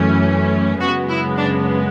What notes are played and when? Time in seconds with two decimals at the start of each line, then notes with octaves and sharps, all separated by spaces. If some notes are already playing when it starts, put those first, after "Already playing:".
Already playing: F#2 E3 A3 C#4
0.81 F#2 C#3 G#3 B3 F#4
1.09 E4
1.37 D4